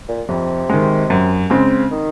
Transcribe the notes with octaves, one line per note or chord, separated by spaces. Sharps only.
A#2
F2 C3
D#3 G#3
F#2
C#3 G#3 C4
D#3